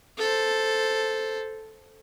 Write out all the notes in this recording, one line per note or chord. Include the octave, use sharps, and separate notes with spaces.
A4 C5